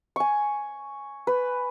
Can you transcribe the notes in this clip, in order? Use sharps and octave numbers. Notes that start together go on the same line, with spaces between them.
G#5 C#6
B4